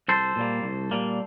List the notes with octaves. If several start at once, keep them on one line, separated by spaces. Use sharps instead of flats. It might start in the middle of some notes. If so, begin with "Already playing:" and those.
C2 A4 C5
A#2 G3 A#3
C2
A#2 G3 A#3